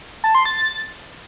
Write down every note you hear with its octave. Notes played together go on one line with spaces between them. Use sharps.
A5
C6
A6